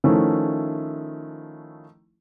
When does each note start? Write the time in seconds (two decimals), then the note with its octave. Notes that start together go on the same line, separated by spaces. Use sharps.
0.04 D#3 F3 A3 C#4 E4